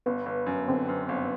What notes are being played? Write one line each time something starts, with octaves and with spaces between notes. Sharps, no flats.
G1 B3
G1
F#2
D3 C4
F#2
G1